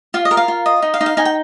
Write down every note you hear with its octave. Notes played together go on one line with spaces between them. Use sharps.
F4 F5
D#5
A#4
F5
F4
D#5
D#4
F5
D#4
F5
D#4 G#5
G5